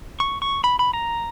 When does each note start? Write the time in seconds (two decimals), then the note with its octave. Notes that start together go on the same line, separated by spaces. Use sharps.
0.20 C#6
0.42 C#6
0.64 B5
0.79 B5
0.93 A#5